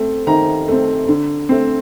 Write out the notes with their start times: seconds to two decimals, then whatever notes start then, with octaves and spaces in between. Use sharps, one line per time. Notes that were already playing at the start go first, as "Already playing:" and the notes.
Already playing: A3 C4
0.27 D#3 A#5
0.68 A3 C4
1.08 D3
1.49 A3 C4